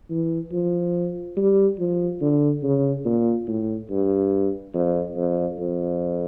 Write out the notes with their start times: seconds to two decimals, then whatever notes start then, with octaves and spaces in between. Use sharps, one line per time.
0.10 E3
0.52 F3
1.37 G3
1.79 F3
2.21 D3
2.63 C#3
3.05 A#2
3.47 A2
3.90 G2
4.74 F2
5.16 F2
5.58 F2